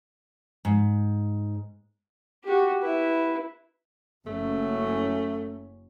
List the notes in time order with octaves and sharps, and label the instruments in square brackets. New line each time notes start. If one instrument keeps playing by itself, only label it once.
[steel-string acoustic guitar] G#2
[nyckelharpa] F#4 G4
E4 B4
[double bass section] F#1 F#3 C#4 [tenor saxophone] A3